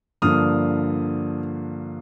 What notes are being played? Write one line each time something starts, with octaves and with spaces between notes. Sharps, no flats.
G2 D3 F3 A#3 D#6 F6